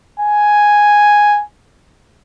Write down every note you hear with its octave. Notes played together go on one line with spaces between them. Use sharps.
G#5